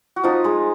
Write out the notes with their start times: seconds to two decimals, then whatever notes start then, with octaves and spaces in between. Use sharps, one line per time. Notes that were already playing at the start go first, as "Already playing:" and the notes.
0.16 F#4
0.23 F3 D#4 F4
0.44 G#3